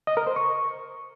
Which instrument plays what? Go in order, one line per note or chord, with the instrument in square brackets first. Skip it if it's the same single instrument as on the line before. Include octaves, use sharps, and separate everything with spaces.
[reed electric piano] D#5
A#4
C5
C#6